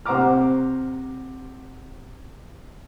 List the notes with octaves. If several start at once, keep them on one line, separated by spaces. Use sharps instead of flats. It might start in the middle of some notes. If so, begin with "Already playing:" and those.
C3 C5 F#5 A#5 D6 F6